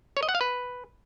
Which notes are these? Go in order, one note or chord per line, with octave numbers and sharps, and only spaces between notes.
C#5
D#5
F#5
F5
B4